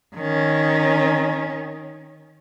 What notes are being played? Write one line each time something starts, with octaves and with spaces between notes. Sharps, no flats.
D#3 C#4